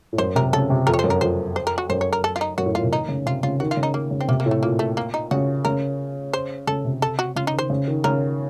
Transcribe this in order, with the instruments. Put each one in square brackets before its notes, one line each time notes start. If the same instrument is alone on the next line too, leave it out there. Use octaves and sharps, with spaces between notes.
[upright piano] A2
[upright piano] F#2 [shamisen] C5
[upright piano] C3 [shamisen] A#4
[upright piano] C#3 [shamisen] A4
[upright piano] C3
[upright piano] F2 [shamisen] A#4
[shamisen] C#5
C5
[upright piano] F#2
[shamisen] A#4
[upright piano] F2 [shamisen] C5
[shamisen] C5
A#4
F#4
[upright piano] F#2 [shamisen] C5
[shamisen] C#5
A#4
A4
F4
D#4
[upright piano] F#2 [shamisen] F#4
[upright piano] A2
[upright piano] A#2 [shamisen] F4
[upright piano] C3
[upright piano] D#3 [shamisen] D#4
[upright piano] C#3
[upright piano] C3 [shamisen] F4
[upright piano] C#3 [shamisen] F4
[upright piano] D#3 [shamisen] F#4
[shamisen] F4
[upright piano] C#3
[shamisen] D#4
A#3
[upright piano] C#3
[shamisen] C4
[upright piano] C3 [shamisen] A#3
[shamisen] A#3
[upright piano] A2
[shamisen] A3
[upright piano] A#2 [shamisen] A#3
[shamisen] A3
A#3
D#4
[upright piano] C#3 [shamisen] F#4
[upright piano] C#3 [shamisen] A#4
[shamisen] C5
[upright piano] C#3 [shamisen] A4
[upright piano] C3
[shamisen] A4
F#4
[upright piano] C#3 [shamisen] F4
[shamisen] D#4
[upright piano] D#3 [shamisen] C5
[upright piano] C#3
D#3
[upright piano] C#3 [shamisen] A#4